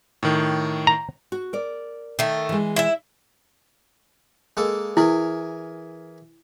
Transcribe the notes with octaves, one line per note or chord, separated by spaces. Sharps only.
A2 D#3
A#5
F#4
A#4 D5
D#3 A3
E3 G#3
E4 E5
G#3 A#3 A4
E3 E4 G#4 A#4